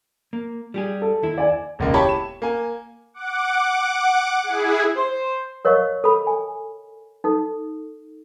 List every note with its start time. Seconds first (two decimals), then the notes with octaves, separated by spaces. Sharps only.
0.33 A#3
0.74 G3 G4 G#4
1.02 A4
1.23 D#2 E4
1.38 D5 G#5
1.79 E1 C#2 A#3
1.94 E4 G4 C#5 A5 B5
2.09 E7
2.42 A#3 G#5
3.14 F#5 D6
4.43 E4 G#4
4.96 C5
5.65 A#4 C#5 D#5 F5 C#6
6.04 A4 B5
6.27 G#5
7.24 D#4 A4